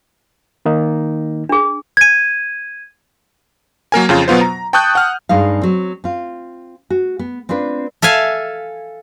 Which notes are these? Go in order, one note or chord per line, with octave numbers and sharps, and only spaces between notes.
D#3 A#3 D#4
D4 G#4
G#6 D#7
F#3 A#3 A#4 G#5
F2 C#3 F4
B2 F#3 B3 F4 C5
A#5
G5 A5 C#6 D#6 F#6 G6
F#5 F6
G2 G#3 D#4 F5
F#3 C4
C4 F4
F#4
B3
C4 D4 F4 B4
A4 E5 F5 G#5